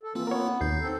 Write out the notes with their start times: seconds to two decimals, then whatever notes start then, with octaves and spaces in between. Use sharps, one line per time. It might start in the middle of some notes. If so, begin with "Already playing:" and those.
0.03 A4
0.15 E3 A#3 C4 F4
0.27 B3 A#4 C#5
0.61 D#2 D#4 G6 C7
0.80 C4 A4